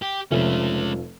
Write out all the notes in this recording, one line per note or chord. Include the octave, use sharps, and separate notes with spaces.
G4
F1 F3 G#3 C#4 E5